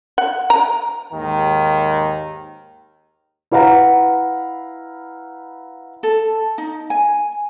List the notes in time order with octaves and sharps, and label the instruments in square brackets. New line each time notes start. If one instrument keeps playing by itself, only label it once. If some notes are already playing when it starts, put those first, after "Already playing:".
[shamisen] F#5
A#5
[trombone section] D#2 G#2 D#3
[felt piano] E4 B4 F5 F#5 A#5
[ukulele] A4
D#4
G#5